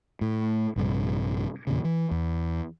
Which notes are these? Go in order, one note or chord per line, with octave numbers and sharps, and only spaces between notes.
A2
A#1 G2 C3
E2 A#2 C#3
E3
E2